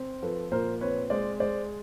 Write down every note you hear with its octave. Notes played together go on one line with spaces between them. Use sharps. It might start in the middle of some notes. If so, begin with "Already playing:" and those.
Already playing: C4
F3 A4 B4
A#2 A#4 C5
C4 B4 C#5
G#3 C5 D5
G#3 C5 D5